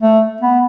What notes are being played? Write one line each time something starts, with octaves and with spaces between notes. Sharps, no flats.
A3
B3